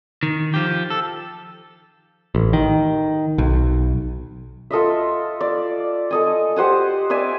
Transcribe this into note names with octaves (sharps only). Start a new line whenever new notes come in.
D#3
F3 G4
A4
A1
D#3
B1
F4 A4 D#5 E5
D5
A4 D#5 G#5
G4 C5 F#5 G#5
D5 E5 G#5